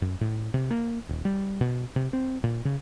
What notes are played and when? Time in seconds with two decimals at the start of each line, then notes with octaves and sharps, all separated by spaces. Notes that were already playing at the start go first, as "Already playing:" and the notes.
0.02 F#2
0.21 A2
0.54 C3
0.71 A#3
1.09 D#1
1.25 G3
1.61 B2
1.96 C3
2.13 C4
2.44 A#2
2.65 C#3